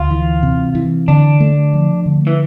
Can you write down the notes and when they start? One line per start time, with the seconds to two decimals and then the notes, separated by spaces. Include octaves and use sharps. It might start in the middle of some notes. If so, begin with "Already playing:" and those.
Already playing: D2 F4
0.11 E3
0.43 C3
0.75 E3
1.08 D3 D4
1.40 A3
1.73 F3
2.06 D3
2.27 E3